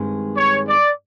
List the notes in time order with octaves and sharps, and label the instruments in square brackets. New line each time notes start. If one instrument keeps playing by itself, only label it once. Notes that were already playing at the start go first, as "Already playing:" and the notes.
Already playing: [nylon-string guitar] G2 D#3 G#3 C4
[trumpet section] C#5
D5